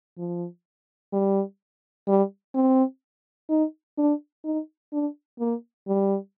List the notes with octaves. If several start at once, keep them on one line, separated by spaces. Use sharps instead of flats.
F3
G3
G3
C4
D#4
D4
D#4
D4
A#3
G3